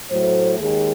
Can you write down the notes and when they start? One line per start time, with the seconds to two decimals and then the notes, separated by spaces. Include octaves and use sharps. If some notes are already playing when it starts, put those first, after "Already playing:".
0.11 A2 F#3 A3 C5
0.60 D#2 D#3 G#3 G#4